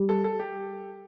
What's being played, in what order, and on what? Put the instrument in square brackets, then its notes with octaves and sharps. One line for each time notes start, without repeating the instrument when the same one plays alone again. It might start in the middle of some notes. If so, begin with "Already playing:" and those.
Already playing: [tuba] G3
[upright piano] A4
A4
G4